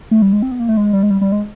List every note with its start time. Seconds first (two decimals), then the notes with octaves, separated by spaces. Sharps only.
0.11 A3
0.22 G3
0.33 G#3
0.42 C4
0.51 B3
0.60 A#3
0.69 A3
0.77 G#3
0.93 G3
1.03 G#3
1.10 G3
1.21 G3
1.32 G#3